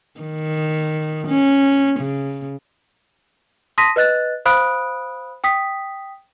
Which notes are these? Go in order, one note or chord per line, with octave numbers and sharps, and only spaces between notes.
D#3
C#4
C#3
A5 C6 D#6 A#6 B6 D#7
B4 D#5 F#6 A6
C5 F5 B5 D#6 F#6 D7
G5 D#6 B6